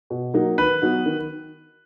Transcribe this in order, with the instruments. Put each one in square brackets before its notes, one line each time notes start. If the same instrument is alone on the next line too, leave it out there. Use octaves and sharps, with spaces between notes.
[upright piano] B2
F#3 A#3 D#4 F#4
[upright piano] D#3 [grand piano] B4
[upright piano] F#3 B3 D#4 F#4
D#3